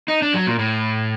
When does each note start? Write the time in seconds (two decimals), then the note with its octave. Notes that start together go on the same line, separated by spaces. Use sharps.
0.08 D#4
0.22 D4
0.34 F#3
0.47 A#2
0.59 A2